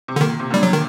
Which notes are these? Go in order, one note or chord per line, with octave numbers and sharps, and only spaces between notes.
C3
D3
A#2 D#3
C3
A#2 D3 G3
F#3
D#3